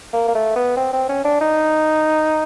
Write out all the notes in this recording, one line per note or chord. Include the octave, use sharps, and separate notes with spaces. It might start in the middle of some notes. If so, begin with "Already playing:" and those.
A#3
A#3
A3
B3
C4
C4
C#4
D4
D#4